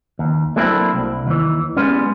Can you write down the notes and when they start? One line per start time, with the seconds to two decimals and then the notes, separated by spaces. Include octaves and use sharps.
0.19 D#2
0.56 F#3 A3 A#3 C4 D4 E4
0.94 C2
1.27 D#2 E3
1.77 G3 G#3 B3 C#4